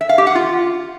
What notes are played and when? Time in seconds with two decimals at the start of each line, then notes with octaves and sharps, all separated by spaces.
0.01 E5
0.09 F5
0.18 G4
0.27 F#5
0.35 F4